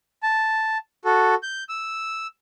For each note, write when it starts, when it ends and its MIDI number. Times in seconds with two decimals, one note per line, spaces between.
0.23 0.78 81
1.05 1.35 66
1.05 1.35 69
1.43 1.64 91
1.69 2.27 88